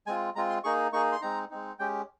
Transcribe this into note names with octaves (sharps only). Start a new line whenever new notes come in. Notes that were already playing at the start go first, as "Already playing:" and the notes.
G#3 C4 F4 G#5
G#3 C4 F4 A#5
C6
A#3 D#4 G#4 C#6
A#3 D#4 G#4 C#6
C6
G#3 C4 D#4 A#5
G#3 C4 D#4
G#3 C#4 G4 G5